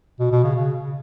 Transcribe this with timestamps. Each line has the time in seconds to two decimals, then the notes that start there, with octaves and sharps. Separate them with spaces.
0.19 B2
0.31 B2
0.43 C#3
0.56 C#3